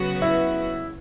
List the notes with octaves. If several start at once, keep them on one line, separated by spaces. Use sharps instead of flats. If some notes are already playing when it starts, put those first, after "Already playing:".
Already playing: C#3 F#3 B3 F#4 B4
E4